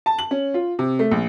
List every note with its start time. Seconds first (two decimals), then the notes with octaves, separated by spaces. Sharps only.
0.06 A5
0.19 F#7
0.31 C#4
0.54 F4
0.79 C3
0.99 A3
1.11 A#1